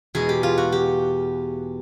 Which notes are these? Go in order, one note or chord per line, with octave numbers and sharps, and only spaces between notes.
E2 B2 G#3 G#4
G4
F4
F#4
G4